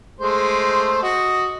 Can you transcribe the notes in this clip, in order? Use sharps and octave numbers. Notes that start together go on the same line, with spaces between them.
G#3 A3 C5
F#4 D#5